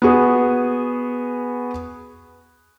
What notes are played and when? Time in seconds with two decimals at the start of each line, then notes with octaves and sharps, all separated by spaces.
0.02 B3 F#4 G#4